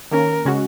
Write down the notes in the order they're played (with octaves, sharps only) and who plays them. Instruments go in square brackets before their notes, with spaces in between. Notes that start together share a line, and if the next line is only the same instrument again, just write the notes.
[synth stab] D#3 A#3 C#4 [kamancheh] A#4
[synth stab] C#3 G#3 C#4 F#4